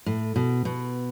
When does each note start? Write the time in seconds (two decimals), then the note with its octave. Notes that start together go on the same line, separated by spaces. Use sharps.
0.06 A2
0.36 B2
0.65 B2